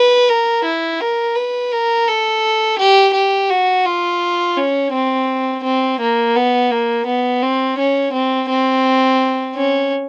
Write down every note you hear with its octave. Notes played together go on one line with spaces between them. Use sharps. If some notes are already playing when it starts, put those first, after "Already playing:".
Already playing: B4
A#4
E4
A#4
B4
A#4
A4
G4
G4
F#4
F4
C#4
C4
C4
A#3
B3
A#3
B3
C4
C#4
C4
C4
C#4